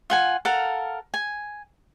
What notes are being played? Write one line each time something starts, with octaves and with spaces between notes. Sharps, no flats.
F4 F#5 G#5
A4 A#4 F5 F#5
G#5